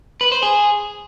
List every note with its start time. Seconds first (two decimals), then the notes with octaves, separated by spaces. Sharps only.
0.21 B4
0.32 C5
0.43 G#4